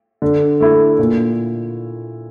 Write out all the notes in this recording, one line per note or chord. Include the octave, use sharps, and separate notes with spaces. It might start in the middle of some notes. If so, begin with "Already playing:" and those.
D3
A3 E4
A#2